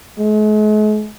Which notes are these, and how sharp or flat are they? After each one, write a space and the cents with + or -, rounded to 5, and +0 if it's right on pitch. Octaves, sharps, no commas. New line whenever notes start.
G#3 +45